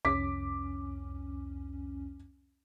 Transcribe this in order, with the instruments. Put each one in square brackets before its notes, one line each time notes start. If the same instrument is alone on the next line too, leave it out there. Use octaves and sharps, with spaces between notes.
[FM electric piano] C2 F2 C#4 [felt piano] D6 B6